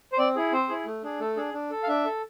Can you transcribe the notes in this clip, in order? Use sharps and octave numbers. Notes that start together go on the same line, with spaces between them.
C5
C4 D5
E4 G#4
C4 C5
E4 G#4
A3
D4 G#4
A3 A4
D4 G#4
D4
A4
F5
D4 E5
A4